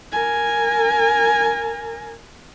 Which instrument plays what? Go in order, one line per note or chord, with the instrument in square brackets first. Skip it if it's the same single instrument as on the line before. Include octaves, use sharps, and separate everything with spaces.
[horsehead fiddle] A#4 G#5